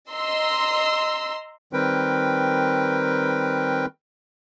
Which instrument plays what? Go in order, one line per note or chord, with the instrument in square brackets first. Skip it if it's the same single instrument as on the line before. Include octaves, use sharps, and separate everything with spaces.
[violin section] D#5 A#5 C6 E6
[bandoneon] D#3 G3 C4 A#4 B4 G5